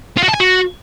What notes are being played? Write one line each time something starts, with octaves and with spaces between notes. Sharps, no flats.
F4
F#4
A5
G#5
F#4